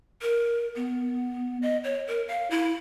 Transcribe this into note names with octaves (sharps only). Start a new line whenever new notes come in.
A#4
B3
D#5
C#5
A#4
F5
E4